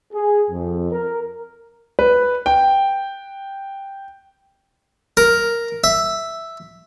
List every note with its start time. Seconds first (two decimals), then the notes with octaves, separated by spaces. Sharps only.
0.13 G#4
0.50 F2
0.91 A#4
1.99 B4
2.46 G5
5.17 A#4
5.84 E5